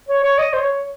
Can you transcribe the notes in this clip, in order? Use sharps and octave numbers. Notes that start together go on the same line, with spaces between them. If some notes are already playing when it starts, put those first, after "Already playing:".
C#5
C#5
D#5
C5
C#5